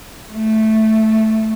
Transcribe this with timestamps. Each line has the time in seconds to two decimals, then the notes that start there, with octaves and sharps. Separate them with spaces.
0.32 A3